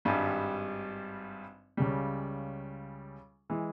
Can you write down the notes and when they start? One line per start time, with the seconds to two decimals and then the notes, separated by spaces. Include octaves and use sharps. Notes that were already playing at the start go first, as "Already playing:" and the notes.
0.05 G#1 G2 G3
1.77 C#2 C#3 G3
3.50 E3 G#3